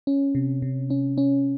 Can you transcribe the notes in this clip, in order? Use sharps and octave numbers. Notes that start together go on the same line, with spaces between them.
C#4
C3
C3
C#4
C#4